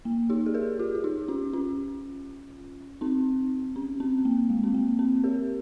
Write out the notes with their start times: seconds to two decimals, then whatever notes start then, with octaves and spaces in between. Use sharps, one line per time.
0.05 A#3
0.30 D#4 G4
0.46 G#4
0.54 G4 A#4
0.79 F4 G#4
0.95 F4
1.04 D#4 G4
1.28 C#4 F4
1.53 C#4 F4
3.01 C4 D#4
3.76 C#4
4.00 C4
4.25 A#3
4.50 G#3
4.64 C4
4.74 A#3
4.99 C4
5.24 G4 A#4